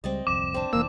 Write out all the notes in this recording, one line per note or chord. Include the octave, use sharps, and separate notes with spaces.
C#2 G3 G#3 C4 D5 D#5
D1 C2 F2 D6 E7
C4 D4
F1 E3 A#3 E6